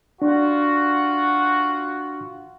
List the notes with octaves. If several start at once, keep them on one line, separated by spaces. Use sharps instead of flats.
D4 F4 F#4